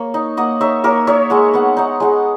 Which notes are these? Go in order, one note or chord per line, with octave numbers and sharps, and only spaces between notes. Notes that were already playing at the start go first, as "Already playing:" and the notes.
Already playing: A#3 C#5
D#4
A#3 D#5 F#5
D#4 C#5 E5
A#3 A#4 C#5
D#4 C#5 E5
G#3 F#5
B3 F#5
D#4 F#5
G#3 F#5